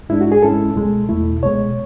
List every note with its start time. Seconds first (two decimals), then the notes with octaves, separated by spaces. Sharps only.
0.09 G#2 G#3 D4 E4
0.21 F#4
0.32 G#4
0.43 G#2 G#3 C#4 E4 A4
0.76 C#2 B2 G#3
1.09 E2 B2 A3 E4
1.42 C#2 B2 G#3 C#5